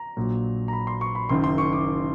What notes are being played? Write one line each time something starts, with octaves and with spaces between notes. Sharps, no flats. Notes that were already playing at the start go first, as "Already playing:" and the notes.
Already playing: A#5
A#1 A#2 F#3
A#5
B5
C6
C#6
B5
F#1 F#2 D#3 C6
C6
C#6
D6